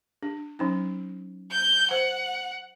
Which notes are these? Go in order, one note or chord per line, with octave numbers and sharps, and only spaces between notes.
D4
F#3 C#4 D#4
G6
C5 F#5